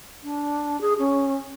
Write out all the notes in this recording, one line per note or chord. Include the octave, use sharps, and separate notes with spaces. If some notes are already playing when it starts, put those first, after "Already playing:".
D4
G#4
C#4